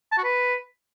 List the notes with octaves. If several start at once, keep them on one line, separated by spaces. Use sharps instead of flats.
A5
F#4
B4